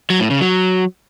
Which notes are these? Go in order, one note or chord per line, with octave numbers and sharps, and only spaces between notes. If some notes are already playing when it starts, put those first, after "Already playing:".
F#3
A2
C#3
F#3